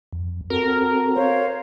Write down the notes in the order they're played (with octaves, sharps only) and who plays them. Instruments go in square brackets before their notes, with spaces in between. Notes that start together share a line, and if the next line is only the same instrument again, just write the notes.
[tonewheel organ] F2
[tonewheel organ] C4 F#4 A4 [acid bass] A#4
[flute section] C5 C#5 F5